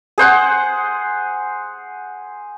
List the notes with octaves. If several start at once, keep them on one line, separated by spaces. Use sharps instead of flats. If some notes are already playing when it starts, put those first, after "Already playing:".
G#4 C5 F#5